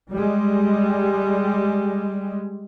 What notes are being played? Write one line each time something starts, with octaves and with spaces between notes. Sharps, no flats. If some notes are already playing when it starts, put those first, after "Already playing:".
G3 G#3